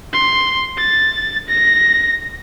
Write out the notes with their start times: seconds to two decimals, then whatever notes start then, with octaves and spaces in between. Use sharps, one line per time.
0.13 C6
0.78 A6
1.49 A#6